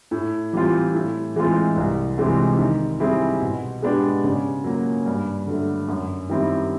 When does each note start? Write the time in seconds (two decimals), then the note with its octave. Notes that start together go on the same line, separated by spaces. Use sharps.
0.11 A2
0.53 E3 G3 C4 F4
0.94 A2
1.36 E3 G#3 C4 F4
1.76 C2
2.18 C3 E3 G#3 C4
2.59 D#3
3.00 G3 C4 E4 G#4
3.41 B2
3.82 G#3 B3 D4 G4
4.24 C#3
4.64 F#3 A#3
5.06 G2
5.47 D3 F#3 A3
5.89 F#2
6.29 D#3 G3 C4 E4